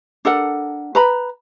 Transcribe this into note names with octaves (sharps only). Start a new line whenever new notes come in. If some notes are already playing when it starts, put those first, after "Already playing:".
D4 A4 A#4 F#5
B4 A#5 B5